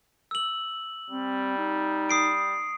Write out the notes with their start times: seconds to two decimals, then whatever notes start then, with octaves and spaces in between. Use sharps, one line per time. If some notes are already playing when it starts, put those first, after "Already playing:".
0.31 E6 F#7
1.10 G3 C4
1.58 D#4
2.09 D#6 C7 D7